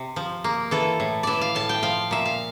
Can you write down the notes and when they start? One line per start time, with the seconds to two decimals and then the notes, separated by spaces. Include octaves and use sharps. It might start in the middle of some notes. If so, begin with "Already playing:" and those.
Already playing: C3
0.16 F3
0.44 A#3
0.71 E3 A4
1.00 A2
1.23 E3 D5 E5
1.41 F5
1.55 A2 A5
1.69 G5
1.83 F3 F5
2.11 A#2 E5
2.25 F5